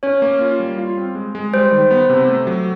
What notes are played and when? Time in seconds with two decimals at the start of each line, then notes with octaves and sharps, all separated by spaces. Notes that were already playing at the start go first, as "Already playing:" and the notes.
0.03 C#4 C#5
0.22 A#3
0.41 F4
0.60 G3
0.78 F4
0.97 C4
1.15 G#3
1.35 G#3
1.53 G3 C5
1.72 D#3
1.91 B3
2.10 C3
2.28 A3
2.47 F#3